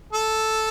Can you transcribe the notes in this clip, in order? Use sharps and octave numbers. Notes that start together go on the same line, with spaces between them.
A4